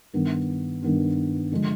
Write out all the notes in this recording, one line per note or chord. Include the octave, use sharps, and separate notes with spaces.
G2 D#3 B3 D4
G2 D#3 B3 D4
D3 F3 G#3 D4